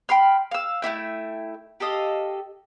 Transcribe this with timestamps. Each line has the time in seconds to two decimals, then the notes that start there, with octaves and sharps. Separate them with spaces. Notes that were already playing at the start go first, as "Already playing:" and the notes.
0.09 G5 B5 C6 F6
0.51 F5 E6
0.82 A3 A#3 E4 G5
1.80 G4 A4 D#5 F5